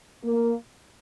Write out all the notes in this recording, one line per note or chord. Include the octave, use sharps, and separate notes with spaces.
A#3